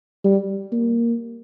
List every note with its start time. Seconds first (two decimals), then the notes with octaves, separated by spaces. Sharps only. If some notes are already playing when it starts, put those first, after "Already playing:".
0.24 G3
0.72 A#3